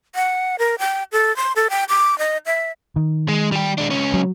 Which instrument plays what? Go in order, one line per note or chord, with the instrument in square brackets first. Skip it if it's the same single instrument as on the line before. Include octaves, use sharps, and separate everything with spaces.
[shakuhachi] F#5
A#4
G5
A4
C6
A4
G5
D6
D#5
E5
[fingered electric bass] D#3
[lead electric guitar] G#3
G3 G4
G#3 D4
C#2 C#4
[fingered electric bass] F#3